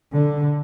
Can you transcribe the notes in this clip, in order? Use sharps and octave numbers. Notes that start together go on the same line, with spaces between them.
D3